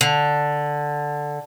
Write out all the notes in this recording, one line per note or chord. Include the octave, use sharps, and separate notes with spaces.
D3